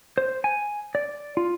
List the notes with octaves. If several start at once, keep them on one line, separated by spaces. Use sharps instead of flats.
C5
G#5
D5
F4